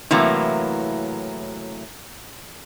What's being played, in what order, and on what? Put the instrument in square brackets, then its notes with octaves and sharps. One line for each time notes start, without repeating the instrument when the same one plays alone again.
[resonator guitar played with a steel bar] A2 C3 E3 F#3 A#3